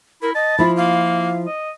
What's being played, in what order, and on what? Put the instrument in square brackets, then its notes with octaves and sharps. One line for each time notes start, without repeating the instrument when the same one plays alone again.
[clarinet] E4 [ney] A#4
[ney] D#5 [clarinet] A5
[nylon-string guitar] F3 E4 F4 [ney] B5
[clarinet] A#3 [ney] F5
[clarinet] D#5